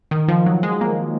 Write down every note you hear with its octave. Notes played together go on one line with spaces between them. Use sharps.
D#3
F3
F#3
G#3
A#3